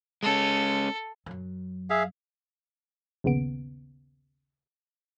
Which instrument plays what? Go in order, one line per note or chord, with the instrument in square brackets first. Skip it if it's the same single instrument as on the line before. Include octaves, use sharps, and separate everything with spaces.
[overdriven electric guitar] G#3 C#4 [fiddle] A4
[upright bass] F#2 F#3
[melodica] G#4 E5 F5
[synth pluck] A#1 D#2 C#3 B3 D7